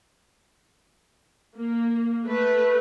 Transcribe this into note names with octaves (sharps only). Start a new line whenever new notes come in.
A#3
A3 B4